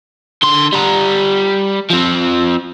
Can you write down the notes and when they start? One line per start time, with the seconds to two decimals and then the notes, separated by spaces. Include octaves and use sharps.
0.43 D3 C6
0.72 G3 A#5
1.91 F3 C4